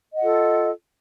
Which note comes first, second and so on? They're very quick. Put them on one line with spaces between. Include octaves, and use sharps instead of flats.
D#5 F#5 F4 A4